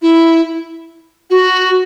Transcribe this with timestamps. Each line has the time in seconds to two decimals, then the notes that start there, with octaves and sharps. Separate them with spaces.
0.02 E4
1.30 F#4